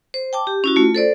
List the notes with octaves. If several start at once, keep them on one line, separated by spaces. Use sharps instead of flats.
C5
G5 A5 D6
G4
C#4 E4 F#4
A3 F4
A4 C5 D5